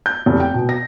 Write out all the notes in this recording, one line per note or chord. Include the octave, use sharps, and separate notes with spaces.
G6
F1
G5
B2
A#6